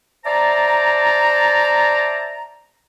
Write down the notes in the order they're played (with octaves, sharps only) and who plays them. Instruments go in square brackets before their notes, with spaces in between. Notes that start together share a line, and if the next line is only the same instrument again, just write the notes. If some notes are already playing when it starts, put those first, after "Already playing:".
[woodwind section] C5 D5 E5 A5 A#5